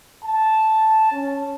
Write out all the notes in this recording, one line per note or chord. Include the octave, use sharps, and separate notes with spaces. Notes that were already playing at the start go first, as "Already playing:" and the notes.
A5
C#4